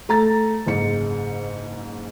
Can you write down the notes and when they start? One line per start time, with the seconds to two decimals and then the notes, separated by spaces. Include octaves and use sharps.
0.09 A3 A#5 A6
0.66 F#1 G#2 G#3 C#7